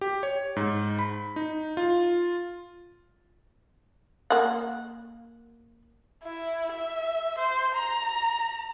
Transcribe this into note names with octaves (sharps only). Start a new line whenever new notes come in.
G4
C#5
G#2
B5
D#4
F4
A#3 F#5
E4
E5
C5
A#5